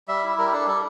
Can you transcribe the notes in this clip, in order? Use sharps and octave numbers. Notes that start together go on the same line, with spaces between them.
G3 E5
E4
G3 A#4
G4
D4 A4
G3 A4